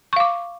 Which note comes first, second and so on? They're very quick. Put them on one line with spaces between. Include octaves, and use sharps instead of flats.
C#6 F5 D6